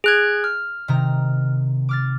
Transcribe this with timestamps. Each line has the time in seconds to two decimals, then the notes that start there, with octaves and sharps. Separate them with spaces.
0.04 G#4 F#6 G#6
0.44 F6
0.88 C3 D#3 A#5
1.89 D6 F6 A6